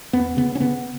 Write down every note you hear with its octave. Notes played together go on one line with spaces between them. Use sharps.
E2 B3
C#3 B3
C#4
C#3 B3